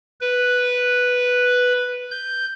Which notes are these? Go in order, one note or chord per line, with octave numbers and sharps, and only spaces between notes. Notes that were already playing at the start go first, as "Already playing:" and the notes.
B4
G6